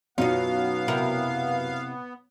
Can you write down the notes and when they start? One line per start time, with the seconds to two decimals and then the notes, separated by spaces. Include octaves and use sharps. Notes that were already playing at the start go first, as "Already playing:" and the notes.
0.18 F#2 B2 F#3 B3 D#4 F4 F5
0.88 C3 E4 A#4